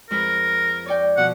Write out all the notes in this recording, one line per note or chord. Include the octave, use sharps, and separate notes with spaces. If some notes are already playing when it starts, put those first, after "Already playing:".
F2 G#3 A#4 B4
C#5 D5 G5
B2 F3 F#5